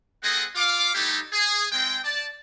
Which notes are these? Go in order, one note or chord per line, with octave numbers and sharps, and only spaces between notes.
G#3 C4 G#4 A4 D#5 F#5
F4 F5 D6
G3 A3 D#4 E4 G4 A4
G#4
G#3 C4 G5
D5 A5